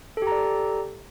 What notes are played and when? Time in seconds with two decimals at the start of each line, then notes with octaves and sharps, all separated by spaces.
0.17 A4
0.22 G4
0.27 A#5
0.32 D5